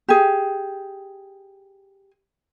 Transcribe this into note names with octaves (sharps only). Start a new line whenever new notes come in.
G4 G#4